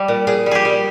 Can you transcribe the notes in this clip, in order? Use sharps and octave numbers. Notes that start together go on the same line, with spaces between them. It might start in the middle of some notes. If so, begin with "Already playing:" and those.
Already playing: G3 G4
A#2
A#2 G#4
G3
G4 G#4
G3